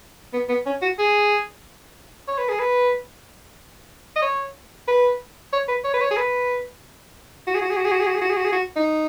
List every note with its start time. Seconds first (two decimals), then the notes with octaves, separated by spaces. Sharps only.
0.33 B3
0.49 B3
0.66 C#4
0.82 F#4
0.99 G#4
2.28 C#5
2.38 B4
2.49 G#4
2.59 B4
4.16 D#5
4.22 C#5
4.88 B4
5.53 C#5
5.68 B4
5.84 C#5
5.94 B4
6.01 C#5
6.11 G#4
6.17 B4
7.47 F#4
7.55 G#4
7.61 F#4
7.70 G#4
7.77 F#4
7.85 G#4
7.92 F#4
8.00 G#4
8.07 F#4
8.14 G#4
8.22 F#4
8.30 G#4
8.37 F#4
8.45 G#4
8.52 F#4
8.76 D#4